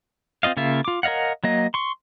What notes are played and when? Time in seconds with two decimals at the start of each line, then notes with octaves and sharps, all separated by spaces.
0.43 C4 F4 D#5 F5
0.57 C#3 A#3 F4 E5
0.85 F4 D6
1.03 A#4 C#5 D#5 F5 F#5
1.44 F#3 A#3 D#5
1.74 C6 C#6